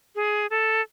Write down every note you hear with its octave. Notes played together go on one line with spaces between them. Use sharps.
G#4
A4